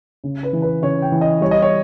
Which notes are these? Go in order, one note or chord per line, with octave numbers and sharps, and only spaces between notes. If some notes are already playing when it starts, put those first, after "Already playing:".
C#3
B4
E3
B4
C#3 C#5
G5
E3
D#5
G3 C#5
D#5
C#5